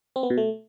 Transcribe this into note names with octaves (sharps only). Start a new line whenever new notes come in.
C4
B3
B2
A3